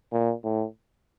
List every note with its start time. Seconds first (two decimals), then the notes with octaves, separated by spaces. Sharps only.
0.12 A#2
0.44 A2